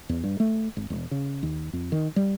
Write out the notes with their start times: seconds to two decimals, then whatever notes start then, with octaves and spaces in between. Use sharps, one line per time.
0.09 E2
0.24 G2
0.40 A3
0.77 G#1
0.90 E1
1.11 C#3
1.43 D#2
1.73 F2
1.92 D#3
2.16 G3